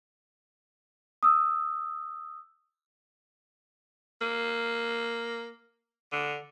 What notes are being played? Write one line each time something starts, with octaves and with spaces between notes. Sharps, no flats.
D#6 E6
A#3
D3